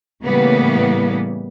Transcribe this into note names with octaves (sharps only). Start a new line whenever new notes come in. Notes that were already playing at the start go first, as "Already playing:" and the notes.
A2 C#3 E3 G3 A#3 B3